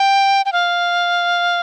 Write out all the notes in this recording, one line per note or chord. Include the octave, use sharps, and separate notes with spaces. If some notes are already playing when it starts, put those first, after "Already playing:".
Already playing: G5
G5
F5